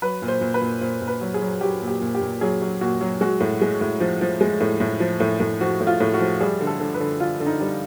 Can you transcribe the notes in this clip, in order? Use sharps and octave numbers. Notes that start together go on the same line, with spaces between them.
F#3 B4
A#2
C5
A#2
B4
A#2
A#2 C5
A#2
B4
F#3
G#4
F#3
F#3 G4
A#2
G4
A#2
G4
A#2
F#3 G#4
F#3
A#2 F#4
F#3
G#3 F#4
A2
G#3
A2
F3
F3
G#3
A2
A2
F3
A2
A2
F3 F#4
A2
F4
A2
F#4
F3
G3 G#4
D3
A4
D3
B4
D3
D3 F4
D3
D#4
G3